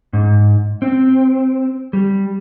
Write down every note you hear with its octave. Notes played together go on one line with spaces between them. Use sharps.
G#2
C4
G3